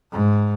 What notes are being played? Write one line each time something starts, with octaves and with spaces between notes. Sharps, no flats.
G#2